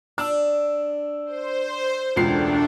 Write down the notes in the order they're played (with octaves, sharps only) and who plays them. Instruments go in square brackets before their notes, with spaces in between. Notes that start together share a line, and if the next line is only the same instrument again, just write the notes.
[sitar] D4 [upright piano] E6
[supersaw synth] C5
[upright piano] E1 C#2 C7 [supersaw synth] A3 D4